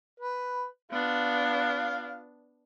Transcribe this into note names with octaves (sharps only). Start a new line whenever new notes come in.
B4
B3 D4 F4 F5